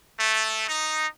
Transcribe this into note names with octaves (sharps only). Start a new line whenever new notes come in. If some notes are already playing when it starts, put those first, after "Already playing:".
A3
D#4